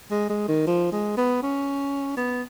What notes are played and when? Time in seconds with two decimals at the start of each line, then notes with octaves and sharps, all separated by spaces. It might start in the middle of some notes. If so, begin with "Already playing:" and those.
0.11 G#3
0.29 G#3
0.48 D#3
0.67 F3
0.92 G#3
1.17 B3
1.43 C#4
2.17 B3